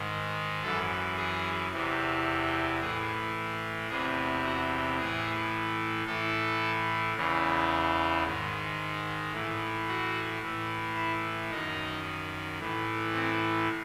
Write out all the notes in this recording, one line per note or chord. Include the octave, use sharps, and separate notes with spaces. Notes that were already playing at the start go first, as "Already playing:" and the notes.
Already playing: G#2 D#3
F#2 E3 A4
G#4
E2 C3 E3
A2 E3 G#4
E2 C3 E3 G#4
F#4
A2 E3 G#4
A2 E3 A4
E2 C#3 E3
G#2 D#3
A2 E3
F#4
A2 E3
E4
F#2 D#3 D#4
A2 E3
C4